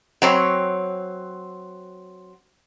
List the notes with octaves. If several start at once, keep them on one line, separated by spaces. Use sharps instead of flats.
F#3 C4 C#5